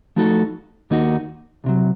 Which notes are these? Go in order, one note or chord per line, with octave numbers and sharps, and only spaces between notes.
F3 A3 D#4 F#4 A4
D#2 D#3 A#3 D#4 F#4
C2 C3 F#3